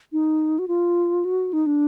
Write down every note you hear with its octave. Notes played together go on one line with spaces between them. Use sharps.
D#4
F#4
F4
F#4
D#4
D4